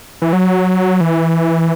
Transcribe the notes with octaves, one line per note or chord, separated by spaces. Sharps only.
E3
F#3
E3